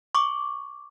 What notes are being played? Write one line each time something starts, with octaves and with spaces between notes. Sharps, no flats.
C#6 D6